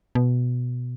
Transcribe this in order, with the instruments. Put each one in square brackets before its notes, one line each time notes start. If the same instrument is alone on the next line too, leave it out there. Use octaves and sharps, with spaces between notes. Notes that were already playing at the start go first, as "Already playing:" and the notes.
[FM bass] B2